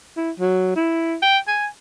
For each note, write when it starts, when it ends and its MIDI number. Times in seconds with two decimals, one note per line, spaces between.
0.17 0.31 64
0.40 0.71 54
0.76 1.16 64
1.22 1.38 79
1.48 1.66 80